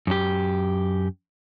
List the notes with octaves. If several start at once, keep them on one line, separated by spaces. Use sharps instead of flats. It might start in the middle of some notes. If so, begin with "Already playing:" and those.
F#2 G4